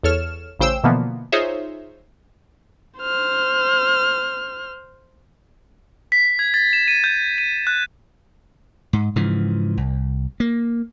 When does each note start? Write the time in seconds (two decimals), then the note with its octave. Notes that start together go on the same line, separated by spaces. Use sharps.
0.03 E2 A4 C#5 F6 E7
0.60 A1 C#3 C5 G5 E6 E7
0.84 B2 D3 E3 F3 A#3 B3
1.32 D#4 F4 G#4 C5 C#5 E5
2.99 C5 F6
6.12 B6
6.39 G#6
6.54 A6
6.73 E7
6.88 D#7
7.04 G6
7.38 D#7
7.67 F#6
8.93 G#2
9.16 G#2 C#3 E3 F3
9.77 C2
10.40 A#3